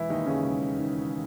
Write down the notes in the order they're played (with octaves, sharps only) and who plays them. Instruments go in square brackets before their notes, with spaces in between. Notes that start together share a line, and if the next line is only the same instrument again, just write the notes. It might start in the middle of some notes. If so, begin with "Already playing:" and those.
Already playing: [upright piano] E1 E3 E4
D#2 D#3 D#4
C#3 C#4
E1
D#3